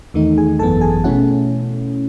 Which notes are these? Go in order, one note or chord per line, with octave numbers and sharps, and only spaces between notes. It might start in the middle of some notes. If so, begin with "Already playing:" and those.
E2 D#3 A3 D#4
G#4 G#5
G#1 F#2 E3 B3 A4 A5
G#4 G#5
B2 A3 C#4 E4 F#4 F#5